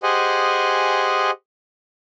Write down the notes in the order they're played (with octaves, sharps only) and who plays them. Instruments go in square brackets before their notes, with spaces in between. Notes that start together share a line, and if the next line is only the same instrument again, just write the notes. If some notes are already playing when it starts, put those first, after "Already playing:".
[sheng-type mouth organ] G4 G#4 C5 D#5 F#5 G#5